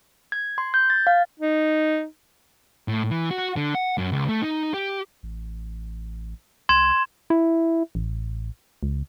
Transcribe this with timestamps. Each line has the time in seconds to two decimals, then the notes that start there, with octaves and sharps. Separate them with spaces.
0.32 G#6
0.58 C6
0.74 G6
0.90 A6
1.07 F5
1.39 D#4
2.88 A2
3.11 E3
3.31 F#4
3.56 D3
3.75 F#5
3.98 F#2
4.12 C#2
4.29 A3
4.42 D#4
4.74 G4
5.23 A1
6.69 C2 C6 G#6 E7
7.30 E4
7.95 A1
8.83 C#2